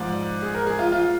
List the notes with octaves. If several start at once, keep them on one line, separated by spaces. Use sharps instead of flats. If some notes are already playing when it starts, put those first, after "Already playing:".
Already playing: G#2 F3 D5
G#4
A#4
G#4
F4
F4